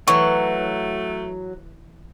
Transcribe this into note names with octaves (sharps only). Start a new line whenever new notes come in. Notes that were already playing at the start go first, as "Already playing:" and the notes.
E3 F#3 A3 C#6